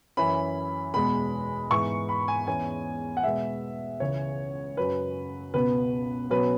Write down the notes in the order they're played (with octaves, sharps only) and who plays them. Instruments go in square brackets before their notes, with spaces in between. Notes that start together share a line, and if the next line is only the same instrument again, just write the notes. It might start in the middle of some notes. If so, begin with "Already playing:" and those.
[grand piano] F#2 E3 C#4 B5
E2 B2 G#3 B3 B5
G#2 E3 B3 C#6
B5
G#5
E2 E3 C#4 G#5
F#5
B2 G#3 B3 E5
C#2 C#3 E3 C#4 C#5
F#2 F#3 C#4 B4
C#2 B2 B3 B4
B2 F#3 C#4 B4